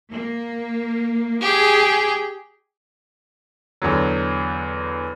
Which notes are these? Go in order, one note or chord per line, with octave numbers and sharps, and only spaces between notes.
A#3
G4 G#4
E2 D3 F#3